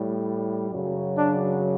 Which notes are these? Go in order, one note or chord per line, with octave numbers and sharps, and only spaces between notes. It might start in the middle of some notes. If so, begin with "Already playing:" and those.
Already playing: A2 G3
F#2 C#3 F#3
D4